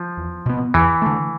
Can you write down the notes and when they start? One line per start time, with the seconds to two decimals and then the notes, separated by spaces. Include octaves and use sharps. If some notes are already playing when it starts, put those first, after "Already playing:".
Already playing: F3
0.17 E2
0.45 B2 B3
0.74 E2 E3
1.02 D3 A3